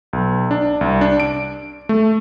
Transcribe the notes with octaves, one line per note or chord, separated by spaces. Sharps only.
B1
D4
C2
D4
D7
A3